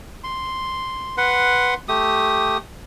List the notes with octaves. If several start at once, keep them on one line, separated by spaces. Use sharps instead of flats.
C6
B4 F#5 C6
A3 G4 D#6